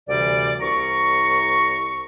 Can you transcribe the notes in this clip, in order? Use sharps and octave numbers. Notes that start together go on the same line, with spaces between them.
D2 C3 E3 G3 D5
C2 A#5 C#6